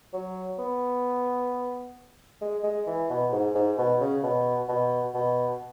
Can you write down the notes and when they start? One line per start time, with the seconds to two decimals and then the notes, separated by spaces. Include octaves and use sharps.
0.13 F#3
0.59 B3
2.41 G#3
2.64 G#3
2.87 E3
3.10 B2
3.32 G#2
3.55 G#2
3.78 B2
4.00 C#3
4.23 B2
4.69 B2
5.14 B2